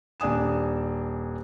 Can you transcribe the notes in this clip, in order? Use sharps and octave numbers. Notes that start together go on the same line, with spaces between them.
D#1 D4 G#5 D#6 E7